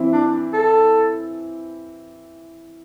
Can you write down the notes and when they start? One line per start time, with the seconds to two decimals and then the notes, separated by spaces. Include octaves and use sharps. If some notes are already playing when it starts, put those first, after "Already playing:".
Already playing: E3 C4 E4
0.13 D4
0.53 A4